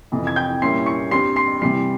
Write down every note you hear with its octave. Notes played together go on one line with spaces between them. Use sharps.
F2 C3 E3
G#6
G5 G6
A#2 G3 A#3 C#4 E4 C6 C7
C#6 C#7
G2 G3 C4 C6 C7
C6 C7
C3 E3 G3 C6 C7